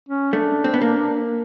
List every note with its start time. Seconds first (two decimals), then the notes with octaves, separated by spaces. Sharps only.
0.08 C#4
0.33 A3 D4
0.64 C4
0.74 B3
0.81 A#3